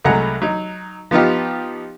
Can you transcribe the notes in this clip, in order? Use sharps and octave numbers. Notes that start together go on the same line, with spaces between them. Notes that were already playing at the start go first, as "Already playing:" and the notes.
C2 F#3 G#3 A3 F#5 A#5
F#3 D#4
F3 B3 D#4 F4 G4